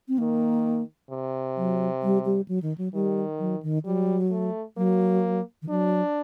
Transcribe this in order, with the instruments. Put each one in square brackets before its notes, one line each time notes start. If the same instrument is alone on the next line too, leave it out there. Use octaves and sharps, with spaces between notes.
[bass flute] C4
[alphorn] D#3 [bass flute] A#3
[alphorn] C3
[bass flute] F#3
G3
G3
F#3
D#3
F#3
[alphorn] D#3 [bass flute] G3
[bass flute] F#3
D#3
[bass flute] F#3 [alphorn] G3
[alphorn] A3
[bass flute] F#3 [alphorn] A#3
[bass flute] D#3
[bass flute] F#3 [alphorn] D4